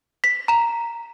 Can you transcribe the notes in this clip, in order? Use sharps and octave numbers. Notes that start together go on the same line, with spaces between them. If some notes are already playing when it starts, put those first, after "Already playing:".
B6
A#5 E7